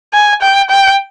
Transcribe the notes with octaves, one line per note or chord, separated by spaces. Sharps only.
G#5
G5
G5